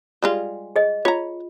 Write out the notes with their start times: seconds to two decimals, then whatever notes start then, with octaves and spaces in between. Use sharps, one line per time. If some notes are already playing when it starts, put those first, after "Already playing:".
0.23 G3 G#3 F4
0.76 G#4 D#5
1.05 F4 C#5 A#5